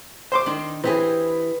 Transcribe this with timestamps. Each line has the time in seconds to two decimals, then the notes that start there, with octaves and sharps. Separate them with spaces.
0.32 C5 C6 D6
0.46 D#3 D4
0.84 E3 C4 G4 G#4 B4